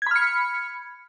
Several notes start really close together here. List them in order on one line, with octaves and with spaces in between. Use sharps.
G#6 B5 F6 C#7